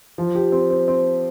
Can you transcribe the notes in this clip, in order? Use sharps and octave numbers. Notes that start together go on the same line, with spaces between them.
F3
G4
C4
C4
C4